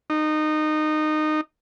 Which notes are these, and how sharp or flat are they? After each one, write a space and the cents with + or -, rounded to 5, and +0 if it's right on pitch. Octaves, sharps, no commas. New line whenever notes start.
D#4 -20